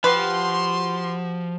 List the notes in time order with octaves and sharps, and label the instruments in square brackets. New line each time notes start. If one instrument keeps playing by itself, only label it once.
[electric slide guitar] F3 [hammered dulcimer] F#4 G4 G5 [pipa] B4 [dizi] C6